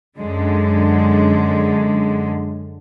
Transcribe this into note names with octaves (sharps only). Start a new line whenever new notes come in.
F#2 D3 G#3